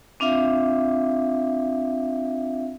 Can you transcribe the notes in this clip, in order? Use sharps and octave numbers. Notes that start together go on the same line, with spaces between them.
C4 D4 F4 E5 F5